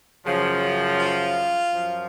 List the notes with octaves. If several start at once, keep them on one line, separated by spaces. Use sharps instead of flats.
F#2 C#3 F3
F4
F#2 F3